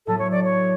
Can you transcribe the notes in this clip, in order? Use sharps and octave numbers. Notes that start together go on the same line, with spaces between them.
A2 F#3 B3 A4
C#5
D5
C#5